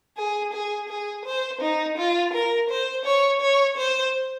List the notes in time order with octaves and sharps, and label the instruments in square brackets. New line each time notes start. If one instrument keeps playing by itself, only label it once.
[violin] G#4
G#4
G#4
C5
D#4
F4
A#4
C5
C#5
C#5
C5